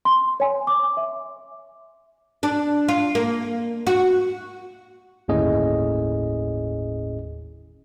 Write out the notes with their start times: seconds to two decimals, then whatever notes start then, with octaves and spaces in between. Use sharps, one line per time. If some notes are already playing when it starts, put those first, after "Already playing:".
0.05 C6
0.40 C#5 G#5
0.67 D6
0.97 E5
2.43 D4
2.88 F4
3.15 A#3
3.87 F#4
5.28 G1 D#2 A2 C#4 G#4 D#5